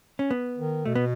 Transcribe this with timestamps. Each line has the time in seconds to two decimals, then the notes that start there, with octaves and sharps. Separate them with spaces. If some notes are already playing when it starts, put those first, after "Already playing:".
0.19 C#4
0.31 B3
0.58 D#3
0.86 B2 A3
0.95 B3